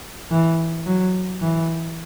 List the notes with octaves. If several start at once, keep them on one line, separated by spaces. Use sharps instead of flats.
E3
F#3
E3